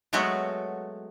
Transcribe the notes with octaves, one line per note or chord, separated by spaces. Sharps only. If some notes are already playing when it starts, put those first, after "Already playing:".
F#3 G#3 A3 B3 F#4